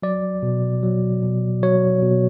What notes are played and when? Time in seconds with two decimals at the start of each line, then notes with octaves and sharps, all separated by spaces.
0.02 F#3 D5
0.43 B2
0.83 F#3
1.23 B2
1.63 F#3 C#5
2.02 B2